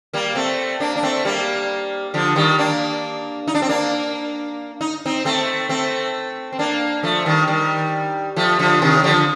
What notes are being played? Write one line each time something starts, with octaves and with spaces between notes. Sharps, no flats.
G3 A#3
A3 C4
A#3 D4
D4
A3 C4
G3 A#3
D3 F3
D#3 G3
A#3 D4
D#4
D4
C4
A#3 D4
D#4
C4 D#4
A3 C4
A3 C4
C4
A#3 D4
F3 A3
D#3 G3
D#3 G3
F3 A3
D3 F3
C3 D#3
D3 F3